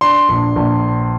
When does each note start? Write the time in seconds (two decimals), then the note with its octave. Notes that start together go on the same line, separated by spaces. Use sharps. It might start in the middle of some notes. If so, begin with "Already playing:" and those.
0.01 D4 C6
0.29 A#1
0.56 A#1